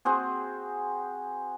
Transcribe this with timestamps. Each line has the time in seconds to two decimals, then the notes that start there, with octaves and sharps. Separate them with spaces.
0.05 C4 F#4 G#4